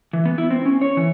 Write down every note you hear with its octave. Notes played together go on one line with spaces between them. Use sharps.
E3
B3
E4
C4
C#4
C#5
E3